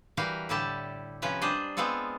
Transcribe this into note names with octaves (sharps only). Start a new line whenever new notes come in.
E3 G3 F#4 G4 A#4 F5
A2 D3 G3 E4 G4 A5
C3 F3 C#4 B4 A#5
G3 D4 C5 D#5
G#3 B3 C4 F4 A4